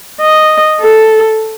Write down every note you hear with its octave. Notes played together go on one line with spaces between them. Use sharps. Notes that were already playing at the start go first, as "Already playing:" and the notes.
D#5
A4